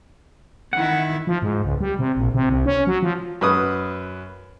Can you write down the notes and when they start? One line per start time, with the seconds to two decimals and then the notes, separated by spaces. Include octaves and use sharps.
0.73 D#3 E4 F#5
1.27 F3
1.42 G#2
1.64 C#2
1.80 G3
1.99 C3
2.17 A#1
2.35 C3
2.49 C2
2.66 C#4
2.87 F#3
3.03 F3
3.41 F#2 B4 D#6